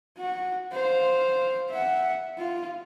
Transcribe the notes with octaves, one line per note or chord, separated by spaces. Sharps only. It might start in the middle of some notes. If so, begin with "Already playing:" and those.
F#4
C5 F5
E5 F#5
F4